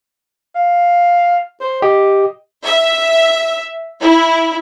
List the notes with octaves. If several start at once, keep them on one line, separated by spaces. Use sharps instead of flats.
F5
C5
G4 D#5
E5
E4